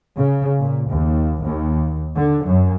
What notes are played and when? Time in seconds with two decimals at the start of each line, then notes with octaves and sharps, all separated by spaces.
0.16 C#3
0.60 A#2
0.90 D#2
1.41 D#2
2.15 D3
2.46 F#2